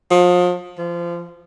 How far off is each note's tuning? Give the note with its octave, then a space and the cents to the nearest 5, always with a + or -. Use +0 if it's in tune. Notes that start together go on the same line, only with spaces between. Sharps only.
F3 +35
F3 -25